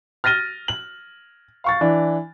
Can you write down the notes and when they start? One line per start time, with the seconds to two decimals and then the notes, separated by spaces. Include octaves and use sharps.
0.24 F6 A6 A#6 D#7 G7
0.68 F#7
1.64 F5 C#6 A6
1.81 E3 D4